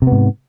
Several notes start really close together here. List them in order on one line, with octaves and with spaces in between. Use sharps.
C3 B3 G#2